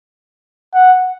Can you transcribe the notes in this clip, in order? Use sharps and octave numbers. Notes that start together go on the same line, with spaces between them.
F#5